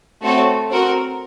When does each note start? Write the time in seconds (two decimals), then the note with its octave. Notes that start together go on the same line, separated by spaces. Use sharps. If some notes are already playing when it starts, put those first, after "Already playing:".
0.22 A3 C4 F#4 A4 C#5
0.69 C4 F#4 A#4